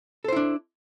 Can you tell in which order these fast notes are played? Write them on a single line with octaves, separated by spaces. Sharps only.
A4 C5 E4 D4